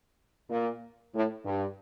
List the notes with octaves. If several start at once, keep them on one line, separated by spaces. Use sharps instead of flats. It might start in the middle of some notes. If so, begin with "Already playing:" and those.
A#2
A2
G2